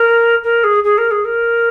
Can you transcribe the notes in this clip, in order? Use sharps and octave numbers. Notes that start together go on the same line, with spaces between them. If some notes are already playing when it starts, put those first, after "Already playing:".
Already playing: A#4
A#4
G#4
G#4
A#4
G#4
A#4